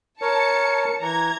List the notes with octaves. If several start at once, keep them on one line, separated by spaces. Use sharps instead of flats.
A#4 C#5 A5 C#7
E3 A#5 G#6